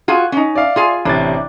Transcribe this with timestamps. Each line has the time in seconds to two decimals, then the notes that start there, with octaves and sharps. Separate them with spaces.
0.08 F4 F#4 G#4
0.32 C#4 D#4
0.55 D5 E5 F5
0.76 F4 G#4 G#5
1.05 A1 C3 D4 A6